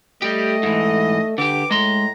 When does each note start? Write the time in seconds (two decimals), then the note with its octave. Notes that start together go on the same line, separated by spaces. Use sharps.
0.22 G3 A3 G4 D#5
0.63 G#2 E3
1.38 D3 G4 B4 D6
1.71 A2 G#3 A#5 C6